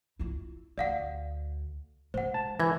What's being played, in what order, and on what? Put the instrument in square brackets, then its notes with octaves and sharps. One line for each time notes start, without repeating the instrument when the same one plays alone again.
[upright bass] E4 F4
[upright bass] D2 [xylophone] D5 F5 F#5
[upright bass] G#3 [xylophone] C5 F#5
[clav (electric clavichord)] A5
[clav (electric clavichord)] E3 [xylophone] G#6 A#6